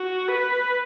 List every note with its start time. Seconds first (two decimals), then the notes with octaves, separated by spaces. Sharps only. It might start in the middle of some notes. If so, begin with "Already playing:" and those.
Already playing: F#4
0.28 B4